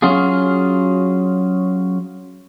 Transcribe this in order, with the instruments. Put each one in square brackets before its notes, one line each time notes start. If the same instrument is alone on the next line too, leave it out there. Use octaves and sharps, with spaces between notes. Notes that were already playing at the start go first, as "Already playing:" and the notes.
[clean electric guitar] F#3 C#4 F4 F#4 G#4